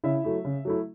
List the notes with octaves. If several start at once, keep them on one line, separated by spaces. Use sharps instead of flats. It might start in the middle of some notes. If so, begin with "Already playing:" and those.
C#3 E4 E5
F#3 A3 E4
C#3
F#3 A3 E4